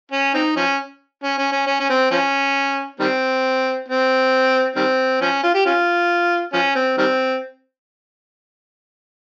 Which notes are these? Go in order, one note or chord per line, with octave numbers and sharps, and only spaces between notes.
C#4
C4 D#4
F3 C#4
C#4
C#4
C#4
C#4
C#4
C4
F3 C#4
D#3 G3 C4
C4
D#3 G3 C4
F3 C#4
F4
G4
C#4 F4
F3 C#4
C4
D#3 G3 C4